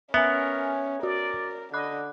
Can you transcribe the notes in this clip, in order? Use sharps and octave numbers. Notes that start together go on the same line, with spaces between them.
B3 C#4 A#4 E5 G#5
F#4 A#4 D5
D3 D#5 B5 D6 F#6